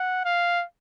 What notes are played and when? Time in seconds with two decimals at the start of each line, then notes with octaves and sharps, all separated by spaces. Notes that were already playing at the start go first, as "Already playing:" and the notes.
Already playing: F#5
0.25 F5